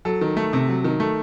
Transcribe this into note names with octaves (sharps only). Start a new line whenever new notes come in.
F#3 A4
D#3
A3
C3
F#3
D#3
A3